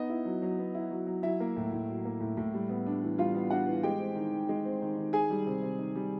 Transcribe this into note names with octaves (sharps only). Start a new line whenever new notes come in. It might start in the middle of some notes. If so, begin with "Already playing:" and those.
Already playing: B3 D#4 D#5
E4
F#3
F#3
B3
E4
F#3
F#3
F#3 E4 E5
A#3
A2
A2
F#3
A#3
A2
A2
G3
B3
D4
E3
G3 F4 F5
B3
D4 F#4 F#5
E3
G#3 G4 G5
C4
D#3
D#3
G#3
C4
D#3
D#3
D#3 G#4 G#5
G3
C3
C3
D#3
G3